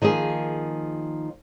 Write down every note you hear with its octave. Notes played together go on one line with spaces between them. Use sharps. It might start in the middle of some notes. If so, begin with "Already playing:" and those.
D#3 F3 A#3 G#4